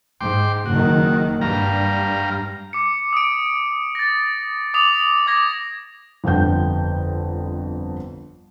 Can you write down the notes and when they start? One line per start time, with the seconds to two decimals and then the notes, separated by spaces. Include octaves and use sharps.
0.21 G#2 G5 C6 D6
0.66 F#1 D#3 F#4
1.41 G2 G3 F5 A#5
2.73 D6 C#7
3.13 D#6 D7
3.95 A6 A#6
4.74 D6 D#6 F7
5.27 D6 G#6 A#6
6.24 G1 F2 D3 G5 G6